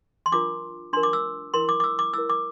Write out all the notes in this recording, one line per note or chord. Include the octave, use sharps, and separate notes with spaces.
C6
D4 F4 A#4 D6
D4 F4 A#4 C6
D6
E6
E4 A#4 C6
D6
D6
E6
D6
E4 A#4 E6
D6